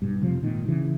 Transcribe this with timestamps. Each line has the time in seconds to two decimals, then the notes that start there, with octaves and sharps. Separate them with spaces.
0.02 B1 G2
0.21 F1 C3 F3
0.42 G#1 A#2 D#3
0.68 C#3 E3